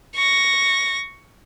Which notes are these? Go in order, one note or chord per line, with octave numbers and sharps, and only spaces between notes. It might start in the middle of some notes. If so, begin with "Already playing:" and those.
C#6 A#6